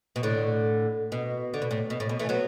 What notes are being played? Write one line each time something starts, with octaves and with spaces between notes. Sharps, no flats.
B2
A2 D3
B2
D3
B2
A2
B2
A2
B2
E3 A3
F#3 B3